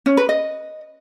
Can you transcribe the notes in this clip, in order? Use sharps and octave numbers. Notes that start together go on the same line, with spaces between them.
C#4
B4
D#5